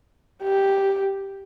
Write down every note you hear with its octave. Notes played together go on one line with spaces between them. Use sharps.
G4